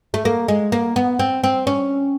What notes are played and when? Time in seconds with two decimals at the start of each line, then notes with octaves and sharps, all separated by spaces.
0.14 A3
0.25 A#3
0.48 G#3
0.72 A#3
0.96 B3
1.19 C4
1.44 C4
1.67 C#4